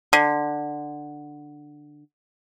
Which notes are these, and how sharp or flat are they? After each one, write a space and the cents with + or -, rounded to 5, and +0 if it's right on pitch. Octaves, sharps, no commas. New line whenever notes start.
D3 +10